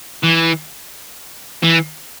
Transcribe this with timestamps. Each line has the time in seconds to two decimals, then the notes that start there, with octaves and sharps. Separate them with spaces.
0.24 E3
1.63 E3